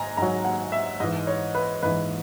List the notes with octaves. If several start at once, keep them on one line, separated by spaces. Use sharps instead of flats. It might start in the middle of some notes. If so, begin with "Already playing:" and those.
Already playing: G#2 G#5 A#5
G#2 F#3 A#5
F#5
E5
G#2 E3 D#5
C#5
B4
G#2 E3 B4